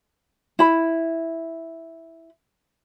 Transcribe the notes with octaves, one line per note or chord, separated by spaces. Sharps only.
E4 B5